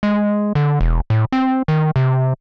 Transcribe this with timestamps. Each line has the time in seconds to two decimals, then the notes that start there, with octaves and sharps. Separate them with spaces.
0.03 G#3
0.55 D3
0.81 E1
1.10 A2
1.32 C4
1.68 D#3
1.96 C3